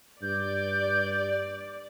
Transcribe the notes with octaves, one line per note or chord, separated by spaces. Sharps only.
G2 D5 G6